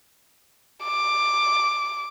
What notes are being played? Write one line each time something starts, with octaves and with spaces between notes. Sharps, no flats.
D6